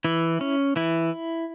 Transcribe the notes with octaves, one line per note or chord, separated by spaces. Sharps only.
E3 E4
C#4
E3 E4